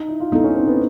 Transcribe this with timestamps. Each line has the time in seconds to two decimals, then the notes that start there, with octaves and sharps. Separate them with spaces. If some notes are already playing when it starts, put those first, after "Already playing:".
Already playing: D#4
0.08 E4
0.20 F4
0.32 G#3 B3 D#4 E4 A4
0.44 C#4
0.56 C4
0.68 B3